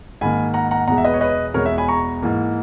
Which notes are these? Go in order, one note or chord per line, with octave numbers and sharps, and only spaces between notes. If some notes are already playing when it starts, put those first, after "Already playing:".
G#2 D#3 A#3 G#5 B5
F#5 A#5
F#5 A#5
E2 B2 G#3 F#5 A#5
E5
B4 D#5
C#5
B4 D#5
E2 B2 G#3 A#4 C#5
C#5 E5
G#5 B5
A#5 C#6
G#2 E3 A#3